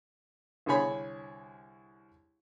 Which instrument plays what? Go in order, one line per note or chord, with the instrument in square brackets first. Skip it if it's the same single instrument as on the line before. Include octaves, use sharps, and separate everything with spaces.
[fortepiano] C2 D3 G#4 C#5 G#5 B5